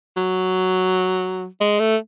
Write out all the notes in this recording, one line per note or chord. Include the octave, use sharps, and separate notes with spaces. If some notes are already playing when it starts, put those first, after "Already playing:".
F#3
G#3
A3